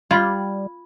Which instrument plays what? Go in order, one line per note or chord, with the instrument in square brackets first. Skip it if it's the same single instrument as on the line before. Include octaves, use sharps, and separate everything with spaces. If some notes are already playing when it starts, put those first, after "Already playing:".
[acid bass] G3 [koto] F4 [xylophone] B5 G#6